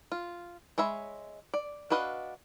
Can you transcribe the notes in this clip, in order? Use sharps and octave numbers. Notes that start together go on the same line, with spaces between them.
F4
G#3 C#5 E5 B5
D5
D4 F#4 B4 D#5 F5